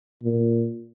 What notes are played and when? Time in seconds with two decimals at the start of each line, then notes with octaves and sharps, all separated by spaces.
0.23 A#2